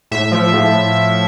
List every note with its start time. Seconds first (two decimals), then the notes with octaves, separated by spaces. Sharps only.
0.11 A2 E5
0.32 F3
0.53 A2